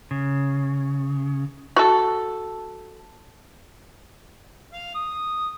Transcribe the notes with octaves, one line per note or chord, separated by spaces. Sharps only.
C#3
F#4 A4
F5
D#6